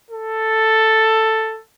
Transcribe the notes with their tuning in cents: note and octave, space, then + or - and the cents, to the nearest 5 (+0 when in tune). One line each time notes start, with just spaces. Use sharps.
A4 +5